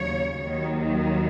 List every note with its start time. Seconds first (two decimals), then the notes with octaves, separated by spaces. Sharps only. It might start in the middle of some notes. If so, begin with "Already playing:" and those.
Already playing: D#2 C#3 F#3 C#5
0.42 D#2 D#3 F#3